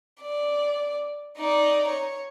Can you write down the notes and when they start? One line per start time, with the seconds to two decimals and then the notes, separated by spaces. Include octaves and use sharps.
0.22 D5
1.37 D#4 D5
1.88 C#5